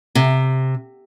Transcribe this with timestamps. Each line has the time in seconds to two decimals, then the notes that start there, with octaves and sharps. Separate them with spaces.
0.15 C3